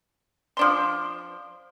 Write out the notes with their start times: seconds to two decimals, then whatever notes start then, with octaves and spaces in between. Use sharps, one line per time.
0.57 F3 D4 C6